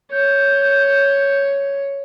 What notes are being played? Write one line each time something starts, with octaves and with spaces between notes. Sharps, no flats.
C#5 G6